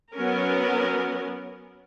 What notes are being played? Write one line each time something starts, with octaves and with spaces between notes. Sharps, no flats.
F#3 B3 C#4 A#4